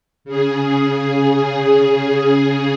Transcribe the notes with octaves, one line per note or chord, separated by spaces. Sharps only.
C#3 G#4